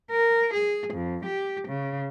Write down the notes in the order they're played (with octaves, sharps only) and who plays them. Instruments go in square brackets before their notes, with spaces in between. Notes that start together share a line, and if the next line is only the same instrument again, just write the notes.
[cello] A#4
G#4
F2
G4
C#3